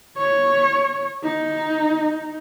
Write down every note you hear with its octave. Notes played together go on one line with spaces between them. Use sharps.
C#5
D#4